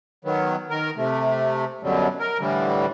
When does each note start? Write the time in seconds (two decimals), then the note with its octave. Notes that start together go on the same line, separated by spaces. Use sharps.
0.25 D#3 F#3 B3
0.70 D#3 A#4
0.96 C3 A3
1.83 F#2 B2 D3 F#3 G3
2.20 A#4
2.39 A2 D3 E3 G3